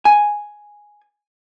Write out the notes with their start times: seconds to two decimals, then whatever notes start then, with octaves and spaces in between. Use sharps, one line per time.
0.05 G#5